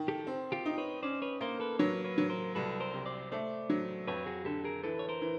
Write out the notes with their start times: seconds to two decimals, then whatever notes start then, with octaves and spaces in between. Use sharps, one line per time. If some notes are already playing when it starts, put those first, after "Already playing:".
Already playing: D#3
0.08 G4 A4
0.27 C4
0.52 F4 G4
0.65 D#4
0.78 B4 C#5
1.03 C#4 C5 D5
1.22 B4 C#5
1.41 A#3 A#4 C5
1.60 A4 B4
1.79 F#3 B4 C#5
2.04 B4 C#5
2.18 F#3
2.29 A#4 C5
2.55 C2 A4 B4
2.80 A#4 C5
2.94 C3
3.06 C5 D5
3.32 A3 C5 D5
3.70 F#3
4.07 F2 B4 C#5
4.26 F#4 G#4
4.45 D3 G4 A4
4.64 G#4 A#4
4.84 E3 A4 B4
4.99 C#5
5.09 A#4 C5
5.22 E3